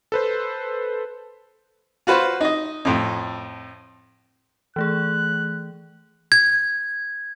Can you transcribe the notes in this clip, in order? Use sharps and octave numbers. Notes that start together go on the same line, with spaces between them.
A4 B4 C5
F4 F#4 B4 C5
D#4 D#5
F2 A2
E3 A3 G#4 F#6
G#6